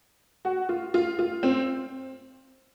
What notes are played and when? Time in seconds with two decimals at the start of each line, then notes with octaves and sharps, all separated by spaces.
0.45 F#4
0.69 F4
0.94 F4
1.19 F4
1.43 C4